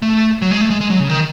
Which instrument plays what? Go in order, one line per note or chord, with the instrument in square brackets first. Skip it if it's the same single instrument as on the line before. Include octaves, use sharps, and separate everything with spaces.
[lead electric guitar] A3
F#3
G#3
A3
G#3
G#3
F#3
C#3
D#3